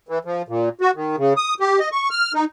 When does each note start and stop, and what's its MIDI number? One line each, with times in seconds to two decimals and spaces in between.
0.09 0.19 52
0.25 0.42 53
0.48 0.69 46
0.81 0.91 66
0.95 1.16 51
1.18 1.33 49
1.37 1.54 87
1.60 1.79 67
1.79 1.89 75
1.92 2.09 85
2.10 2.33 89
2.34 2.45 63